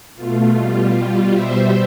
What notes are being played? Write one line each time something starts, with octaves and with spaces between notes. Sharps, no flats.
B2 A3 F4
B2 G3
B2 G3 F4
B2 G3 C5 E5